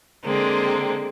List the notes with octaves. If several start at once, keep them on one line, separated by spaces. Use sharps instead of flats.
D3 G#3 A#3 C4